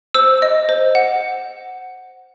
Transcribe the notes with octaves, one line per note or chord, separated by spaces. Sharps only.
C5 E6
D#5
C5
F#5